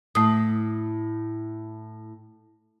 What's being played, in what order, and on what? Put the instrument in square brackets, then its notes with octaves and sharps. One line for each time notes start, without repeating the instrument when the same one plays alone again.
[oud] A2 [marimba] A3 D#6